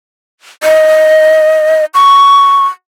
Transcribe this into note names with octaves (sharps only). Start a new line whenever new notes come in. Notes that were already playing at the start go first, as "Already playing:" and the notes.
D#5
C#6